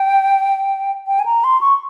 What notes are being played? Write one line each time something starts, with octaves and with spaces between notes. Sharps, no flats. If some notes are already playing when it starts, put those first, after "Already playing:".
Already playing: G5
G5
G#5
A#5
C6
C#6